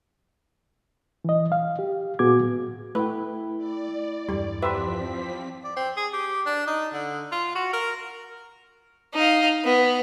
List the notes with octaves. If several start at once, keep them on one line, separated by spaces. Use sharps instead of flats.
E3 D#5
F5
G4
A#2 B3 F#4 G#4 D6 G#6
A2
A3 E4 B4 G5
D5
E2 G2 G3
F3 C4 G4 B4 C5 E5 B6
D5
C4
G#4
G4
D4
D#4
D3
F4
F#4
A#4
D#4 F5
B3